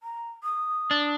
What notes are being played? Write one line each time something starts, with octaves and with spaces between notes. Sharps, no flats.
A#5
D#6
D4